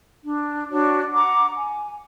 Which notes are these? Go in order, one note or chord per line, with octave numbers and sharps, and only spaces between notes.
D4
D4 F#4 C#5 D5
F#5 A#5 D6
G#5